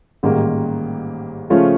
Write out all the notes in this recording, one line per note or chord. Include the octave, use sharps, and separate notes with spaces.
A1 G#2 D#3 G3 A#3
C#3 F3 A3 C#4 F4